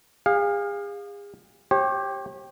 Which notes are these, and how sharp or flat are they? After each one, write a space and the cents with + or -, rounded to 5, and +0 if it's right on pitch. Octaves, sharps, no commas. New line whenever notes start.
G#4 -40 F5 +15
G4 +0 C#5 -40